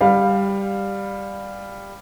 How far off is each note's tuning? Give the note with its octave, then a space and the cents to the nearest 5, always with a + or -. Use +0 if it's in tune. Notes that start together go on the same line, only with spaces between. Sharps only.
G3 +10 F5 +15